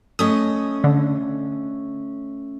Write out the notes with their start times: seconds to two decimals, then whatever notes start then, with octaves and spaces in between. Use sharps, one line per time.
0.19 A3 C#4 D#5 D#6
0.84 D3